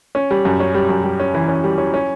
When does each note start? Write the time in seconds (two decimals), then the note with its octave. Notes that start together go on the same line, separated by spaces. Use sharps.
0.15 C#4
0.31 G3
0.45 F#2
0.60 C#4
0.74 G3
0.89 F#2
1.04 G3
1.20 C#4
1.34 E3
1.48 C#4
1.64 G3
1.78 C#4
1.94 C#4